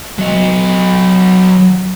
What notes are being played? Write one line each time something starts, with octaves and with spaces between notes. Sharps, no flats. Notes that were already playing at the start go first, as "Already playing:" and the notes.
F#3 D#5